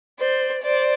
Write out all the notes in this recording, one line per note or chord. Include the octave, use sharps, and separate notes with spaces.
C5 D5
C5 D5